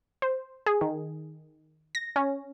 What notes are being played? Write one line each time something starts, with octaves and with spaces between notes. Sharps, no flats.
C5
G#4
D#3
A#6
C#4